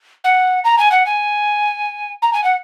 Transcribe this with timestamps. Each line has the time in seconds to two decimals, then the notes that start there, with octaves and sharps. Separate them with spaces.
0.24 F#5
0.64 A#5
0.78 G#5
0.92 F#5
1.06 G#5
2.22 A#5
2.33 G#5
2.44 F#5